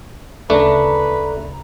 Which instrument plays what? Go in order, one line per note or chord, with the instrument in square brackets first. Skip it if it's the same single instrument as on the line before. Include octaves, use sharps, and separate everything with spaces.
[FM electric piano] D2 C#3 A#5 [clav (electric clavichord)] A3 D4 [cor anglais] B4